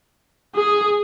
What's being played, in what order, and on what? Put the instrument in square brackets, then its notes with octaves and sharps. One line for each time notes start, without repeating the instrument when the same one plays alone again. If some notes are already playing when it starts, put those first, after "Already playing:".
[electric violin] G#4